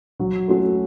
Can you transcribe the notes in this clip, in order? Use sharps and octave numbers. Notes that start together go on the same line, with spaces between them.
F#3
A3 C#4 F#4 A4